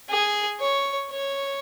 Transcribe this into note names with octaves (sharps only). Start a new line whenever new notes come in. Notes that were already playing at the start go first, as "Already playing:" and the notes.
G#4
C#5
C#5